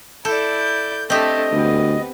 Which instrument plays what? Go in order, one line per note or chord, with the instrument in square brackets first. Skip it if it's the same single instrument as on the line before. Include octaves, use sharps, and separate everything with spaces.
[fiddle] E4 D5 [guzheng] A4 [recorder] G6
[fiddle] A3 D4 [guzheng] C4 G4 [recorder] D#5
[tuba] D2 [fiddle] B3